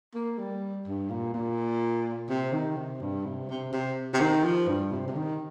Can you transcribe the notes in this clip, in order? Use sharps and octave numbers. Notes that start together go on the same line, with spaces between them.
A#3
G3
G2
A#2
A#2
C3
D#3
C3
G2
C3
C3
C3
C3
D#3
F3
G2
C3
C3
D#3